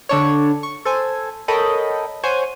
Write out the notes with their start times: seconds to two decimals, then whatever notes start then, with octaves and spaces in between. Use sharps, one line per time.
0.09 D3 D4 C#5
0.63 C#6
0.85 A4 C5 G#5
1.48 A4 A#4 C#5 D#5 G5 B5
2.23 C5 C#5 F#5 G#5